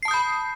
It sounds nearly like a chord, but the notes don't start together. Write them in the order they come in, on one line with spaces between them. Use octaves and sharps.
C7 A5 D#6 G6 B5